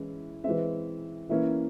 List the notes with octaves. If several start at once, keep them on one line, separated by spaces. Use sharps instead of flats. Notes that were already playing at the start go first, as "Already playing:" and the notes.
Already playing: E3 G#3 C#4 E4
E3 G#3 C4 E5
E3 A#3 C#4 E4 E5